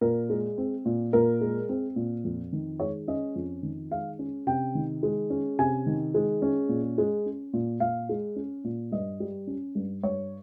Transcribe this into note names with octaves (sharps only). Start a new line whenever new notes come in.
A#2 A#4
G#3
C4
A#2
A#2 A#4
G#3
C4
A#2
F2
D#3
G#3 C#5
C#4 D#5
F2
D#3
G#3 F5
C#4
C3 G5
D#3
G#3
C#4
C3 G#5
D#3
G#3
C#4
A#2
G#3
C#4
A#2
A#2 F5
G#3
C#4
A#2
G2 D#5
G3
C#4
G2
G2 C#5